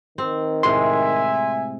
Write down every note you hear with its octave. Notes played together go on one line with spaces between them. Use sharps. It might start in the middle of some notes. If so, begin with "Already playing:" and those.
D#3 C4
A2 C3 G#3 E5 G#5 C6